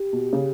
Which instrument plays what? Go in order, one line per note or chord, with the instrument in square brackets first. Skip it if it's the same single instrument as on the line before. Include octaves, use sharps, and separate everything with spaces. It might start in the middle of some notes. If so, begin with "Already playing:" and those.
Already playing: [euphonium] G4
[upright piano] B2
C#3